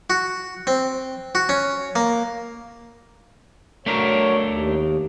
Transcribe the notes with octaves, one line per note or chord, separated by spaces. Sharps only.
F#4
C4
F#4
C#4
A#3
F#3 A3 D4 A#4 C#5
D#2